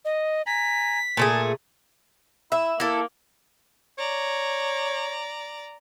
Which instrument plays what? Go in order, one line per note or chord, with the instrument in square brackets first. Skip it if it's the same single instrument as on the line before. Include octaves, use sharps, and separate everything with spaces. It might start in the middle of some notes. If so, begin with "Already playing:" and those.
[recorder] D#5
[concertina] G#5 A#5 [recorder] B6
[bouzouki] A#2 A3 G#4 [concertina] G#5 A5
[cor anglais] E4 [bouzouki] E5
[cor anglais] A#3 [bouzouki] E4 A4
[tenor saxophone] C#5 [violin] D5 A#5